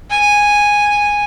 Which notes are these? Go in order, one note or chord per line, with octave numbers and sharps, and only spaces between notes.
G#5